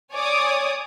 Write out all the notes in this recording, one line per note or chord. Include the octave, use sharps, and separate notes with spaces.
C#5 D5 G#5 D6 D#6